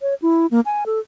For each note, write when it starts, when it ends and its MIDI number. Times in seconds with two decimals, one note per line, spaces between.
0.01 0.14 73
0.22 0.46 64
0.51 0.60 58
0.66 0.84 80
0.86 0.99 69